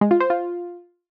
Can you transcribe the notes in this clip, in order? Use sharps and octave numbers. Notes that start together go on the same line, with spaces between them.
G#3
F4
C5
F4